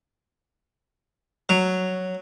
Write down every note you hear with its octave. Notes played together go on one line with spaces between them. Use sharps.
F#3